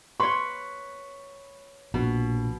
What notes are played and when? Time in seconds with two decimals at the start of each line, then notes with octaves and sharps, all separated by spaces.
0.20 B4 C#5 C6 C#6
1.94 A#1 B2